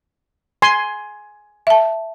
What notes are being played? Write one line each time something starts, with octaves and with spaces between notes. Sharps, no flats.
G#5 C6
E5 A5